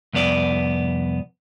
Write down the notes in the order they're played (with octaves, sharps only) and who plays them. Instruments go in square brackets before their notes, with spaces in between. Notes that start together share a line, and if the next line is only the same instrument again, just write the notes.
[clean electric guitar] C2 F2 B3 D5